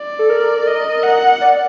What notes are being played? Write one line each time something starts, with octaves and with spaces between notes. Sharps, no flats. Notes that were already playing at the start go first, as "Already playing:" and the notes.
Already playing: D5
A4
A#4
D#5
F#5
D5